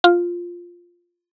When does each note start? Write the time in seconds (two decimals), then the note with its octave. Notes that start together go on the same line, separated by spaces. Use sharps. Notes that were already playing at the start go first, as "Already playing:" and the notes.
0.04 F4